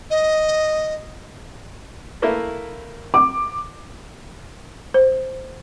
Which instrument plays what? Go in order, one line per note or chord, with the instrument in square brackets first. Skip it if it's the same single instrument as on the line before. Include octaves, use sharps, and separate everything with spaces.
[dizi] D#5
[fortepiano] A3 A#3 E4
[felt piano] D6
[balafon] C5